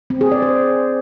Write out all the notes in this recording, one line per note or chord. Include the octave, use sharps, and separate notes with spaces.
C4
G#4
D5
C5